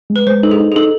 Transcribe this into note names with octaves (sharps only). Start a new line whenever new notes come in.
G#3
B4
G#3 C5
D#4 A4
G#4
D#4
G#4
D#4 A4